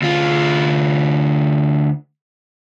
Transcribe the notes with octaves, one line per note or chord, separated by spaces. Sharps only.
D2 F4